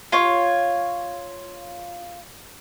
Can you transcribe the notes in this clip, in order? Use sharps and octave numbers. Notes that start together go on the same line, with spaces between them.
F4 C#5